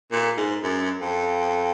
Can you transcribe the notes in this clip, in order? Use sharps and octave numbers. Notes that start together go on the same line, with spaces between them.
A#2
G#2
F#2
F2